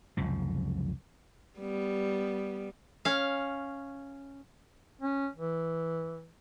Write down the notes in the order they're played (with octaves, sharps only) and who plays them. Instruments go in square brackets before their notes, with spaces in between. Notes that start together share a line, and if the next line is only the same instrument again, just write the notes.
[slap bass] F1 C#2 F#2 F3
[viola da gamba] G3 B3
[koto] C#4 F5
[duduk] C#4
E3